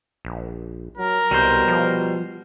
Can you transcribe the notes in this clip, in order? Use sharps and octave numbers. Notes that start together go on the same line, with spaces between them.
A#1
F#3 A#4
C2 B2 G3 C5
F3